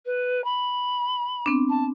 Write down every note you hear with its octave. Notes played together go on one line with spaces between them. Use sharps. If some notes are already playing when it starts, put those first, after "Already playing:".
B4
B5
B3 C4 D4
A5